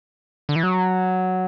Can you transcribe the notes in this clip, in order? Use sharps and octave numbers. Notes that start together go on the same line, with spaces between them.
D3
E3
F#3